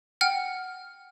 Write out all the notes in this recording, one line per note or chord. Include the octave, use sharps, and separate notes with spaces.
F#5 G5 F6